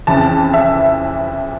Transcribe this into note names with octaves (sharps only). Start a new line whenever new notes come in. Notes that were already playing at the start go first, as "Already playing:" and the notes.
F2 C#3 E3 A5
E5